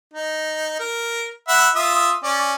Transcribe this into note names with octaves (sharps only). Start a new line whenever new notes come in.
D#4
A#4
E5 F#5 B5
F4 E5 D#6
C#4 D5